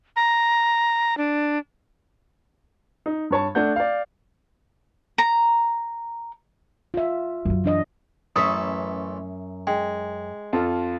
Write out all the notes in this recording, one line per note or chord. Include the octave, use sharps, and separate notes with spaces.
A#5
D4
D#4
G2 C#5 A5
A3 D4 F#5 G6
D5 F5
A#5
F4 E5
F#2 F#3
E3 D4 D#5
A1 F#2 A4 B4 E5 C#6 D#6
G#3 G5
F2 F4 A4